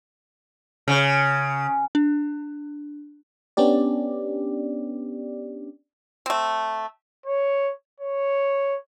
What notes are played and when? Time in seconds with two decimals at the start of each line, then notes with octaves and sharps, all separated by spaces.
0.88 C#3
1.95 D4
3.57 B3 C#4 D4 G4 D5
6.26 A3 C4
7.26 C#5
8.00 C#5